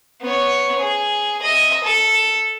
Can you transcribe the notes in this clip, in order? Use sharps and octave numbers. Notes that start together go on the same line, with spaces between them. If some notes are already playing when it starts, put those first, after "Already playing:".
B3 C#5
G#4
D#5 E5
A4